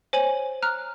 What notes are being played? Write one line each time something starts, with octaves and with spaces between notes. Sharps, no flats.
C5 C#5 G#5 F#7
A#5 F6 F#6